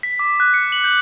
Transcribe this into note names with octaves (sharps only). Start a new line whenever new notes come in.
B6
D6
F#6
C#7
F#7
G6